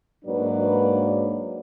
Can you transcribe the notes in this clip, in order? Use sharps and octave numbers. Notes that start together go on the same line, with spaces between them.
G#2 F#3 A#3 D4 B4 D5